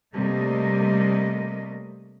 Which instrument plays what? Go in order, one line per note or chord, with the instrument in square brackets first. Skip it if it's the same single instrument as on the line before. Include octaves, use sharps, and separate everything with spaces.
[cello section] C3 G3 A3 A#3 D#5